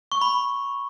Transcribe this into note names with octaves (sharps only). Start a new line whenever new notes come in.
C#6
B5